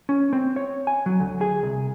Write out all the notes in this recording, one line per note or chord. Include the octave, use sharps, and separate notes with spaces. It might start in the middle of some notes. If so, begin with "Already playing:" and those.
C#4
C4
C#5
G#5
F#3
D2
G#4
C2